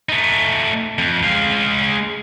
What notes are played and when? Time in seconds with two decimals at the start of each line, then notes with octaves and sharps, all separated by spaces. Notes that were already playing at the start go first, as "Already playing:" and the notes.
0.09 A3 D#4
0.99 F2
1.23 G#3 F5